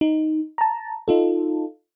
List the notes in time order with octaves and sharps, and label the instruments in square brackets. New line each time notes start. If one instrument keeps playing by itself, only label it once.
[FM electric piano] D#4
A5 A#5
D#4 F4 A4